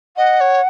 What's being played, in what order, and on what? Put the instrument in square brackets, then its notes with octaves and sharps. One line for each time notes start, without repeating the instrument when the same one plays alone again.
[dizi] D#5 [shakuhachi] F#5
[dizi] C#5